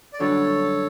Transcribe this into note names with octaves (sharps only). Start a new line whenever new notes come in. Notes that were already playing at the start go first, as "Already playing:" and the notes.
D5
F#2 D3 G3 D4 F#4 A4 C#5